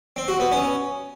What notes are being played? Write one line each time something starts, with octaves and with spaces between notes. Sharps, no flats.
C4
F#4
B3
C#4